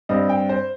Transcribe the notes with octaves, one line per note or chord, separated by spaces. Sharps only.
G2 G3 C4 D#5
G5
C5